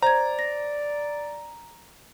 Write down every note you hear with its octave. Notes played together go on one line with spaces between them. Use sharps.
C5 D5 A#5 G#6
A#6